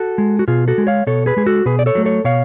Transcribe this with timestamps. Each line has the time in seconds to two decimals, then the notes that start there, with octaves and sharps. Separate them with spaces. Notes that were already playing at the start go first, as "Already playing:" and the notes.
Already playing: F#4 A4
0.18 G#3
0.39 F#4
0.48 B2 F4 G#4
0.68 F#4 A4
0.78 G#3
0.87 C#5 F5
1.07 B2 A4 C#5
1.26 G#4 B4
1.37 G#3 G#4
1.46 F#4 A4
1.66 B2 G#4 B4
1.79 D5
1.86 A4 C#5
1.95 F#3 A3
2.05 A4 C#5
2.24 B2 C#5 F5